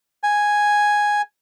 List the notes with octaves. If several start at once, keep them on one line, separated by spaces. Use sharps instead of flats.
G#5